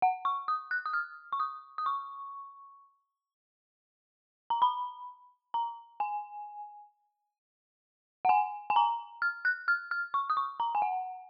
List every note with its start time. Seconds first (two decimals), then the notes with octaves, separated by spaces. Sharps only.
0.02 F#5
0.25 C#6
0.48 D#6
0.71 F#6
0.86 D#6
0.94 F6
1.33 C#6
1.40 D#6
1.78 D#6
1.86 C#6
4.50 A#5
4.62 B5
5.54 A#5
6.00 G#5
8.25 F#5
8.29 G#5
8.70 G#5
8.76 A#5
9.22 F6
9.45 F#6
9.68 F6
9.91 F6
10.14 C#6
10.30 D#6
10.37 C#6
10.60 A#5
10.75 G#5
10.82 F#5